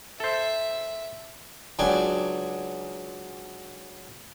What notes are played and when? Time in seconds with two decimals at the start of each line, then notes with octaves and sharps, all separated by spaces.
0.20 A4 C5 E5
1.79 C#2 F#3 D4 G#4 G5 G#5